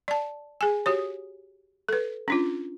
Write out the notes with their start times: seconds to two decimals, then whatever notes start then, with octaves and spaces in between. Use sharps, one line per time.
0.08 D5 A5
0.61 G#4 G#5
0.86 F#4 G4 C#5
1.89 A4 B4
2.28 C#4 D4 F4